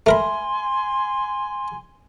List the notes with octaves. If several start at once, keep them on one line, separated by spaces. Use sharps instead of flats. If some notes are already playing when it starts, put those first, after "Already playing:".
A3 A#4 G#5 B5 C6